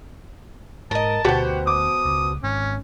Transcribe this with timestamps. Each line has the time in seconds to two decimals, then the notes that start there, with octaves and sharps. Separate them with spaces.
0.91 G#2 A#4 D#5 A5
1.25 D2 B2 F#4 G4 C5 F#5
1.67 D6 D#6
2.05 C#2
2.43 G#1 G#2 C#4